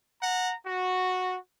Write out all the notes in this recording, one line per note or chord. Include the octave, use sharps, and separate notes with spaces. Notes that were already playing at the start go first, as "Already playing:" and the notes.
F#5 A#5
F#4